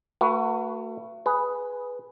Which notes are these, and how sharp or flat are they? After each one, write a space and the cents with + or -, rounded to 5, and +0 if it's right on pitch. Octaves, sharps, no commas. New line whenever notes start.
A3 +40 F#4 +0 B4 -10
G#4 +0 B4 +0